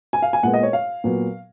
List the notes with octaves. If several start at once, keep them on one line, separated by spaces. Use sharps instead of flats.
G#5
F5
G#5
A#2 G#3 B3 F#5
D#5
C#5
F5
A#2 F#3 B3